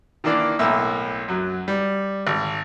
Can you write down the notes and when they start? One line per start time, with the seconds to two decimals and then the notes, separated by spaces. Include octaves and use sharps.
0.24 D#3 E3 A#3 D4 D5
0.59 B1 A2 A#3 E5 E6
1.28 F#2 F#3
1.68 G3
2.27 G#1